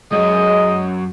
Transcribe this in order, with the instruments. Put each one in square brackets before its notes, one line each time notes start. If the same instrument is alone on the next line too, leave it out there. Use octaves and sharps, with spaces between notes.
[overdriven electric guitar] F#2 [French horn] G#3 [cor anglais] D#5